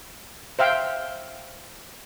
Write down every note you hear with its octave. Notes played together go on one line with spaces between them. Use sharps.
C5 E5 F5 G5